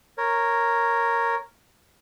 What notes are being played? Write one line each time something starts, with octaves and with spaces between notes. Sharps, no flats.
A#4 C#5